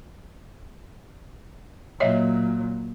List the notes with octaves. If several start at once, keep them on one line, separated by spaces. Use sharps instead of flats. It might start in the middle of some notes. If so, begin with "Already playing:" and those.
A#2 F#3 C#5 D#5 E5